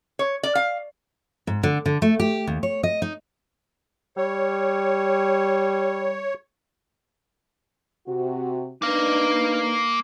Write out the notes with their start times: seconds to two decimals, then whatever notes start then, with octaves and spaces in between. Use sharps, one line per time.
0.19 C#5
0.43 D5
0.55 F5
1.47 G#2
1.63 D3
1.86 D3
2.02 A3
2.20 G4
2.47 D#2
2.63 C#5
2.83 D#5
3.02 D#4
4.17 G3 C#5
8.07 C3 F#4
8.82 A#3 D4 D#4 B4 F5